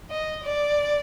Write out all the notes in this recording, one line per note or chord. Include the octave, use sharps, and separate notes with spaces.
D#5
D5